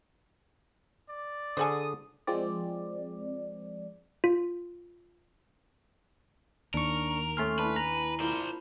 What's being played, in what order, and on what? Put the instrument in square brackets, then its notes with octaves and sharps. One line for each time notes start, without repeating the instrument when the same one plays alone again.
[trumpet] D5
[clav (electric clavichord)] D3 G#4 A4 [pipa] C5 F#5 G#5 [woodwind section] D#6
[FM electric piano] F3 G#3 C4 D5
[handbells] F4
[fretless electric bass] D#2 [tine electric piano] D4 C#6 [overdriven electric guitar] A#4
[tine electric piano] A3 C6 F6 [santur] C#4 C#5 G#5
[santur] D4 E4 [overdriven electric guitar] B4
[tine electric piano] A#5
[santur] A#3 E4 F4 [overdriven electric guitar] C5 D5